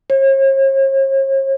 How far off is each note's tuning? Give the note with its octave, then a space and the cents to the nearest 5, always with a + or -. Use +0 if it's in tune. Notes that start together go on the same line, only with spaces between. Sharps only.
C#5 -45